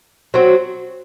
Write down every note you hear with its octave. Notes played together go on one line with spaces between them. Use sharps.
F#3 C4 F#4